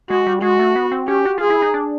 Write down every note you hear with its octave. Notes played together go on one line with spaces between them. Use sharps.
G#3 F#4
G3
G#3 F#4
A3
B3
C4
C#4 G4
F#4
F4 G#4
E4
D#4
D4